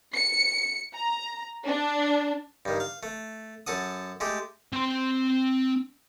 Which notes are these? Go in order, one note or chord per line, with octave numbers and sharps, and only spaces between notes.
C#7
A#5
D4
G2 D#3
F5
A3
F#2 A4 F#5 D#6
G#3 A3 G4
C4 C6